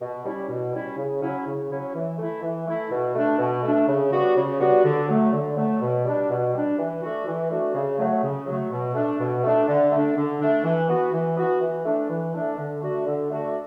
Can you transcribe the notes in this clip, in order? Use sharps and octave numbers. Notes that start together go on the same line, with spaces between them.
B2
G3 C#4 E4
B2
G3 C#4 E4
C#3
F#3 C#4 E4
C#3
F#3 C#4 E4
E3
A3 E4
E3
A3 E4
B2
A3 D4
B2
A3 D4
C#3
G3 B3 D4 F#4
C#3
G3 B3 D4 F#4
D3
F#3 A3
D3
F#3 A3
B2
G3 D4
B2
G3 D4
E3
A3 D4 F#4
E3
A3 D4 F#4
C#3
F#3 A3
C#3
F#3 A3
B2
A3 D4
B2
A3 D4
D3
A3 D4
D3
A3 D4
E3
B3 F#4
E3
B3 F#4
E3
A3 D4
E3
A3 D4
D3
A3 D4 F#4
D3
A3 D4 F#4